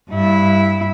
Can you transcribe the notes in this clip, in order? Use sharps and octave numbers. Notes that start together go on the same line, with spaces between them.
G2 E4